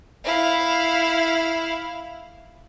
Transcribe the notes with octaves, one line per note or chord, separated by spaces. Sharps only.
E4 F5